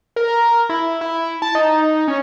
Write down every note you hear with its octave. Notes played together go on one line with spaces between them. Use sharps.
A#4
E4
E4
A5
D#4
C#4